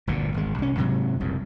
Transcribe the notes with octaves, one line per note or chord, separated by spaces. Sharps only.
G1 D2 A#2
G#1 G#3
C2 C#4
G#2 C3 F#3
F#1 C2 F#2